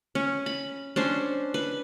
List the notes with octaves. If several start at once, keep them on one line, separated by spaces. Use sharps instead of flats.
C#4
B5
C#4 D4 C5
B4